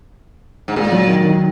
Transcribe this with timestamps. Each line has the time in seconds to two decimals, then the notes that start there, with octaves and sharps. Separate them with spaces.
0.68 G#2
0.76 A#2 G#3
0.92 F#3
1.08 D#3
1.23 D#3